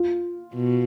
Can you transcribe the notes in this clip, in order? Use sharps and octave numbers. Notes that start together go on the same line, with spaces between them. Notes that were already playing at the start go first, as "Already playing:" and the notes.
Already playing: F4
B2